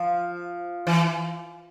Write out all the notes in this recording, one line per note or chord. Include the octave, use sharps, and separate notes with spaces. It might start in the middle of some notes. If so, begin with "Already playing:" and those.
Already playing: F3
E3